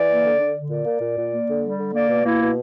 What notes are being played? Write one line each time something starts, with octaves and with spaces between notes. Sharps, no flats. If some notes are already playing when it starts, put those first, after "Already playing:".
Already playing: E3 D5
A#3
D3
D3
D3
A#2 D5
A#3
A#2
A#2
A#3
D3
G3
D3
A#3 D5
B2
A#3 E4
B2